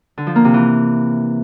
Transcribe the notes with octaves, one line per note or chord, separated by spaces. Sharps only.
D3
F3
A#3
C3
E3